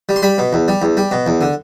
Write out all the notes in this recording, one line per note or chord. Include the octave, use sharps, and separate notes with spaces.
G3
C6
G3 B5
B2
E2
G3
E2
G3
B2
E2
D3